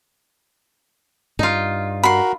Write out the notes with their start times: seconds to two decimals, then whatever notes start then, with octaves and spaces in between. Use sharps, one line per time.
1.39 G2 D#4 F4
2.03 F#4 A#4 B5 C6